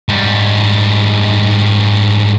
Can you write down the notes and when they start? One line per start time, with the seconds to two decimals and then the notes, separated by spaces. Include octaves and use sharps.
0.09 G#2 G3